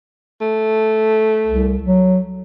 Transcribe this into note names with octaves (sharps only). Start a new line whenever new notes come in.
A3
C2
F#3